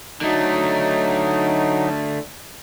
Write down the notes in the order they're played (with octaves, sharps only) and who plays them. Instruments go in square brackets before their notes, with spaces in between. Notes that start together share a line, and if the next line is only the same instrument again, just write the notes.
[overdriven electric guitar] D3 A3 [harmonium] F#3 D#4